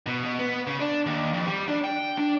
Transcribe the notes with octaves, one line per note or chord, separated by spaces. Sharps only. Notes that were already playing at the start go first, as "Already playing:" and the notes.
B2
B2
B3
C#3
D4
D#2
F2
G3
D4
G5
D4